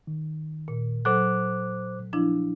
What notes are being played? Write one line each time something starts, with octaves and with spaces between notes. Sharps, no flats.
D#3
A#2
F#3 A4 C5 D6 F#6
F3 D4 E4